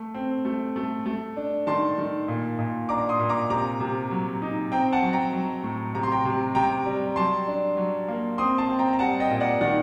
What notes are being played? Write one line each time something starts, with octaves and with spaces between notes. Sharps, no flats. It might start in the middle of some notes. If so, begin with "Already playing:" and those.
Already playing: A3
C4
A3
A3
A3
D4
D#3 A5 C6
D#3
A#2
A#2
D4 A#5 D6
C6 D#6
A#2
A#5 D6
C3 A#5 D6
C3
F#3
D#4
C4 G5 A#5
F#5 A5
F#3
G5 A#5
F#3
A2
C3 A#5
C6
G5 A#5
C3
C3 G5 A#5
G3
F#3 A5 C6
D4
F#3
A#3
C4 C6 D#6
A5 C6
C4
G5 A#5
A#5
G3 F#5 A5
D#5 G5
A#2
D5 F#5
D#3 D5 F#5